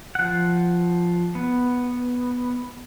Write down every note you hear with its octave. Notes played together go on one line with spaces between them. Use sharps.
F3 F#5
B3